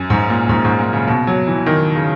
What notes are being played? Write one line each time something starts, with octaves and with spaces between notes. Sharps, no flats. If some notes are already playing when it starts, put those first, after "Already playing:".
Already playing: F#2
G#2
A#2
G#2
G#2
A#2
C#3
B2
F#3
E3
D#3
C#3